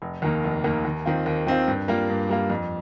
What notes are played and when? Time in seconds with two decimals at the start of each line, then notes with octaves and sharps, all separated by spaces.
0.02 F1
0.22 D#2 D#3 A#3
0.44 F1
0.64 D#2 D#3 A#3
0.85 D#2
1.05 D#3 C4 F4
1.26 D#2
1.47 D#3 C4 F4
1.68 G2
1.88 G3 A#3 F4
2.10 G2
2.29 G3 A#3 F4
2.50 F2